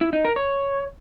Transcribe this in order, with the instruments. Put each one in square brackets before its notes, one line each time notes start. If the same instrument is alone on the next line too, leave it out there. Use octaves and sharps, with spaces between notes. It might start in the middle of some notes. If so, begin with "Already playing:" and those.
[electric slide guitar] E4
D#4
A#4
C#5